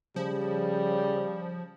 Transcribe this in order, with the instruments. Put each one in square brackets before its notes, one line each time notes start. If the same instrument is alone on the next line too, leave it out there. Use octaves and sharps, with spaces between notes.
[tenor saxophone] C#3 [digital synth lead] F3 [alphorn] G3